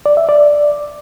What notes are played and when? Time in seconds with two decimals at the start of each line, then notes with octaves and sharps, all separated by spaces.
0.06 D5
0.17 E5
0.29 D5